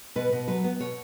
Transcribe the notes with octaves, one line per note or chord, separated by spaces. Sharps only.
B2 B4
B2
F#3 B4
B3
B2 C#5